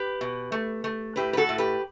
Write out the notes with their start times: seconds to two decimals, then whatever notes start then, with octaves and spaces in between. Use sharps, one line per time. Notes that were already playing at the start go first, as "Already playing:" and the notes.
Already playing: G4 B4
0.21 B2
0.52 A3
0.84 A3
1.16 A2 G4 B4
1.33 B4
1.37 F#4 A4
1.49 A2
1.58 G4 B4